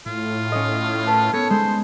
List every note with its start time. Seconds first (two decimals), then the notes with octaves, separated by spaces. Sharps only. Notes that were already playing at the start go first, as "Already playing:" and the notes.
0.06 A2 F4
0.52 C#4 D#5
1.07 B4 A5
1.33 B3 A4 C#5
1.50 G#3 C5